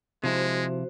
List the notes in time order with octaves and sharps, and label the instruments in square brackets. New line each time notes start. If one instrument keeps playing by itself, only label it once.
[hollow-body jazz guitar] C3 F3 E4 [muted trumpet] G#3 [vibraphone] F#4 C5